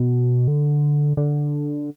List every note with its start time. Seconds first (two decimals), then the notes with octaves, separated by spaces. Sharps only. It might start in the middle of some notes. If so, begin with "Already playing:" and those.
Already playing: B2
0.48 D3
1.17 D3